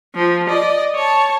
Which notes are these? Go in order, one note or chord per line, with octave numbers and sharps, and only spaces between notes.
F3
D5 D#5
C#5 A5